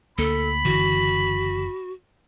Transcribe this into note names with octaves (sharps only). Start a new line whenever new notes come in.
D2 A#3 A4 B5
F#1 D3 E3 F#4